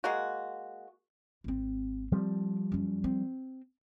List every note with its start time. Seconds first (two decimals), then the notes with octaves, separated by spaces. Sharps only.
0.04 G#3 A#3 F#4
1.44 G#1 C4
2.12 F3 G3 C4
2.72 F#2 C#4
3.04 C4